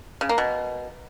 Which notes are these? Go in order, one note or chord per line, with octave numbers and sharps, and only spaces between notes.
C#3
A#3
B2